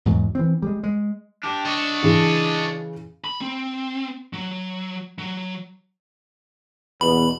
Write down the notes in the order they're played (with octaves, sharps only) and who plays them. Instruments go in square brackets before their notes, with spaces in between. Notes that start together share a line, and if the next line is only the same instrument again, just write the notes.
[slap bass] E2 G#2 F#3
E3 C4
G3 G#3
G#3
[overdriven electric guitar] D4 G4
[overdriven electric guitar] D4 [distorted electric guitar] C#5 D#5
[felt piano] C#3 E3
[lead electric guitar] B5
C4
F#3
F#3
[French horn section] E2 B2 B3 [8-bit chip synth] B5